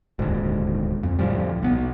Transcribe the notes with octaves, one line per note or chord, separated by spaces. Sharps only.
D#1 D2 G#2
F2
D2 A2 F3 G3
B1 B3